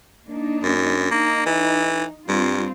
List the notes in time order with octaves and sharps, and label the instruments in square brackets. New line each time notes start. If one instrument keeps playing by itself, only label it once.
[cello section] A#3 D4 D#4
[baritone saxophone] F#2
[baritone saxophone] A#3 [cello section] D#4
[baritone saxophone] E3
[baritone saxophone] G2 [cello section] G3 C4 F4